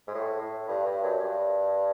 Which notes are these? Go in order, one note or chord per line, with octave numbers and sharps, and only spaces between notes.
G#2
A2
A2
G2
G2
F#2
G2